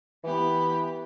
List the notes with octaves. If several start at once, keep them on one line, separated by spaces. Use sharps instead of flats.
E3 B3 G4 B5